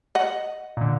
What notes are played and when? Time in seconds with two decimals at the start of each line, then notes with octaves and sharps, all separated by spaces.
0.15 D#5 F#5
0.77 A#2 D3